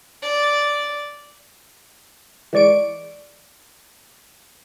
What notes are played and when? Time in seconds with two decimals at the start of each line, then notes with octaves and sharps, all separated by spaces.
0.22 D5
2.53 E3 G#3 D5 C#6 D7